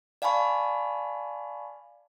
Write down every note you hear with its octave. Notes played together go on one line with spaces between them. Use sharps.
D5 F5 G#5 A5 B5 C#6